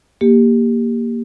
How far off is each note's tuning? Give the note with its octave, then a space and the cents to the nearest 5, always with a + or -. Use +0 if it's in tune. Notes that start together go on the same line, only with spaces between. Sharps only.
A#3 +0 G4 +15